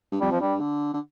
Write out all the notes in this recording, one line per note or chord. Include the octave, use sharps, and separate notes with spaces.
G2
F2 G3
F3
G2 G3
D3
D3